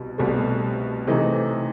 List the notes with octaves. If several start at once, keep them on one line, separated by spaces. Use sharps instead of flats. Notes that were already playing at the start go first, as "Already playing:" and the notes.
Already playing: C2 B2
C2 B2 A3
C3 E3 A3 D#4